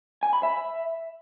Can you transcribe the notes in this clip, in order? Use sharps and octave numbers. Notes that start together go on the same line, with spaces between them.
G#5
B5
E5